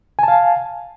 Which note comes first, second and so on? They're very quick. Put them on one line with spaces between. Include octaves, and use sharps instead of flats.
G#5 A5 F5